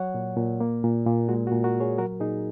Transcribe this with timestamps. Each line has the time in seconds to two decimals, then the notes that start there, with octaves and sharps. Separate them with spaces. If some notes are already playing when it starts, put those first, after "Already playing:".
Already playing: F#3 C#5 F#5
0.14 A#2
0.37 A#2
0.60 A#3
0.84 A#2
1.06 A#2
1.29 G#3 F#4
1.47 F#4
1.52 A#2
1.64 F#4 A#4
1.75 A#2
1.80 G#4 C#5
1.98 F#3 F#4 A#4
2.20 A#2 D#4 G#4